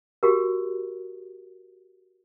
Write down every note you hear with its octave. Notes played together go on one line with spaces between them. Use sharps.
F#4 G4 A#4